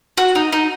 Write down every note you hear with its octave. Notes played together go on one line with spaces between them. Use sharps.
F#4
D#4
D#4